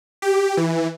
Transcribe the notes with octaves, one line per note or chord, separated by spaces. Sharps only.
G4
E3